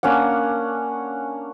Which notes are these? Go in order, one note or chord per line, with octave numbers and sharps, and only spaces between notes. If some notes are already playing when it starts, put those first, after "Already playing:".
A#3 C#4 D4 F#5